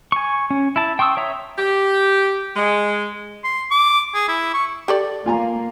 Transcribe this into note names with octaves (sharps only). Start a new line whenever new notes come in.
G#5 C#6
C#4
E4 A5
G5 C6 C#6 D#6 E6
C#5 E5 A#5 D#6
G4
G#3
C6
D6
G#4
E4
C#6
G4 A4 D5
A#3 F4 G#5 A#5